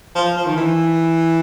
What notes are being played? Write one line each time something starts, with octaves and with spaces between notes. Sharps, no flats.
F3
F3
D#3
E3